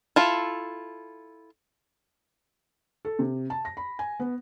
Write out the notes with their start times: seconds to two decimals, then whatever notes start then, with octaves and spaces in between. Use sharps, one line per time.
0.16 E4 F4 A4
3.05 A4
3.19 C3
3.50 A5
3.65 A#6
3.77 B5
3.99 G#5
4.20 B3